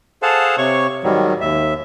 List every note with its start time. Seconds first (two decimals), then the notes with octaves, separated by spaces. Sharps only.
0.22 G#4 A4 C5 F5 F#5 A5
0.58 C3 C#5 C#6
1.04 G#2 D#3 F#3 G3
1.41 D#2 E5